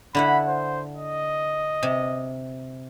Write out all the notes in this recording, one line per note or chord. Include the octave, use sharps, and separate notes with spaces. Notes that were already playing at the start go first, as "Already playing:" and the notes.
D3 E4 F#5 B5
C5
D#5
C3